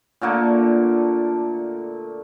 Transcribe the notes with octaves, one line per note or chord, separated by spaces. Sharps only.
A#2 D3 A3 A#3